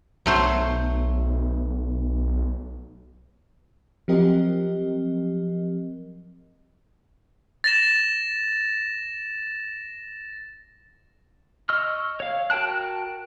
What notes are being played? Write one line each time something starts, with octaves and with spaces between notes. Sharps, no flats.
B1 F#3 A3 C5
F3 F#3 C4 G4 A#4 D#5
A6 A#6 E7
D#5 C#6 E6 F6
C#5 F5
F#4 A#4 G5 A5 F#6